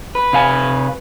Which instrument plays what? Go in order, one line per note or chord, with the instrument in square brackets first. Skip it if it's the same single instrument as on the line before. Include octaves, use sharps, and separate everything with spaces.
[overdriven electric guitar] B4
[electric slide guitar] C3 F5 G#5